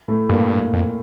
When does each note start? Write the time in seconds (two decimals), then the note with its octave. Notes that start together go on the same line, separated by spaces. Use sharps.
0.08 A2 A3
0.29 G2 A#2 A#3
0.73 F2